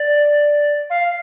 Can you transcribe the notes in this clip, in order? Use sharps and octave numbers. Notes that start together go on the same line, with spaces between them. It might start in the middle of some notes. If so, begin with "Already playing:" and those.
Already playing: D5
F5